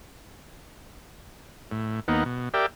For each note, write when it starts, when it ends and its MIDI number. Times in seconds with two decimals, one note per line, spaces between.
1.71 2.00 45
2.08 2.24 39
2.08 2.24 58
2.08 2.24 59
2.08 2.24 63
2.08 2.24 78
2.25 2.49 47
2.54 2.66 67
2.54 2.66 70
2.54 2.66 74
2.54 2.66 76
2.54 2.66 79